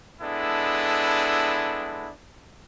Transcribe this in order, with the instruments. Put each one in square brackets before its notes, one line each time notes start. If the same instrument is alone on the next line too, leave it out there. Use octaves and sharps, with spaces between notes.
[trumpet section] G#3 B3 D4 E4 A4